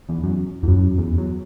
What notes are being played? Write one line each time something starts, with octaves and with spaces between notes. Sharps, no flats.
E2
F#2
E2
F#2
E2
F#2